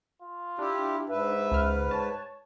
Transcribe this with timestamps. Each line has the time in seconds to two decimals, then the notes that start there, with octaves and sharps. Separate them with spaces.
0.22 F4
0.59 D4 E4 G4
1.09 G#2 B4 E5
1.51 C#2 F6
1.91 C#5 A5